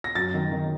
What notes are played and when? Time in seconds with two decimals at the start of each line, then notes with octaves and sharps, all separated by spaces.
0.04 A#6
0.15 F#2 A6
0.34 D#3
0.52 D#3